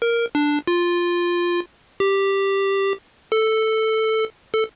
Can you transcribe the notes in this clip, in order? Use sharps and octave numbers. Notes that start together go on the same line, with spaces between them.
A#4
D4
F4
G4
A4
A4